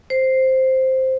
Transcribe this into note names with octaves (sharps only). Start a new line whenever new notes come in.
C5